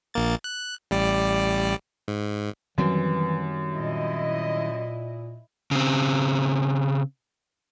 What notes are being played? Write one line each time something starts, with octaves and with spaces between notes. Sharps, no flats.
A#1 A#3 A6
F#6
A1 G3 D5
G#2
F#2 D#3 E3 G3 C4
A#2 E4 D#5
C#3 C4